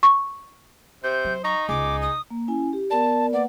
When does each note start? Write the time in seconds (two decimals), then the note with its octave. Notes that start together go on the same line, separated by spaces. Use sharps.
0.03 C#6
1.04 C3 C5 G6
1.25 F#3
1.44 D#4 A#5 C#6
1.69 C#2 G#4 D6
2.02 D#6
2.30 A#3
2.48 C#4 E4 G#5
2.73 G4
2.90 B3 A#4 D5 A5
3.32 A#3 B4 D5 F#5